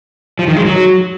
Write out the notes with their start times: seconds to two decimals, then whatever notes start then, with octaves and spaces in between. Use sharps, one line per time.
0.39 F3
0.48 D#3
0.57 G#3
0.66 F#3